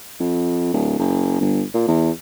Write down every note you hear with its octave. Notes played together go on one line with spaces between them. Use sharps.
F2
D1
F#1
G1
A#2
E2